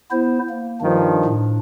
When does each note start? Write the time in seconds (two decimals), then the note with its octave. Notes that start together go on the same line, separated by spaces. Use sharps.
0.11 B3 E4 C5
0.49 A#3
0.80 G2 D#3 F3 D4
1.25 A2 D4